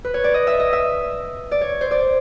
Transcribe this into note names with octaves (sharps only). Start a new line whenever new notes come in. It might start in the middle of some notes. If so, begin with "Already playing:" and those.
B4
C#5
D5
D#5
E5
D#5
E5
D5
C#5
C5
D5